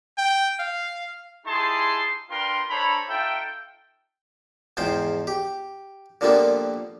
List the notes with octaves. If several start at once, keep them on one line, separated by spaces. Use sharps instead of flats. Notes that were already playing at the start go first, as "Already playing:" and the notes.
G5
F5
D#4 E4 G4 G#4 A5 C6
D4 F4 A#4 B4 G5 C6
D4 A4 C5 C#5 A#5 B5
D#4 F4 A4 E5 G5
E2 G#2 F3 C5 G5
G4
A#2 D3 F3 G3 A#3 B3